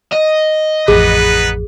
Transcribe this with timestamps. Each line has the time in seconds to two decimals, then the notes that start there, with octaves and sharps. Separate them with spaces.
0.13 D#5
0.88 A1 F2 B3 D#4 G#4 B4